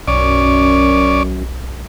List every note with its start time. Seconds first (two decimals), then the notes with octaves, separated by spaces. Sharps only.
0.08 B1 F#2 C#4 D5